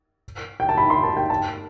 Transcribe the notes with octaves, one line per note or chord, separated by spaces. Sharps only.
G5
A5
B5
C6
A5
G5
A5